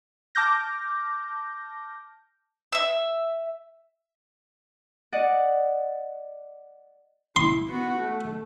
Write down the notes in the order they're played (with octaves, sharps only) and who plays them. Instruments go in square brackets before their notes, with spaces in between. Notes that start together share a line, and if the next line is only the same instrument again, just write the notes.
[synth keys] A5 D6 F6 G6 A#6
[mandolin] E5 E6
[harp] D5 D#5 F#5
[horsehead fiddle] E4 [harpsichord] C6
[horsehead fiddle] B3 F#4
A3